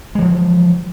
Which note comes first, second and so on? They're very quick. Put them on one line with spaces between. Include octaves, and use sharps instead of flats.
G#3 E3 F3